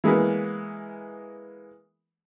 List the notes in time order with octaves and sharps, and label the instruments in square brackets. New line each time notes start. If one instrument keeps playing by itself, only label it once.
[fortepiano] E3 G#3 A#3 B3